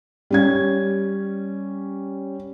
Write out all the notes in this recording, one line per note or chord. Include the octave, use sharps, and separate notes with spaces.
G3 C#4 G#6